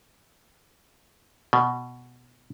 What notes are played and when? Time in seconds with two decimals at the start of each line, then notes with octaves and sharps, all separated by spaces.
1.53 B2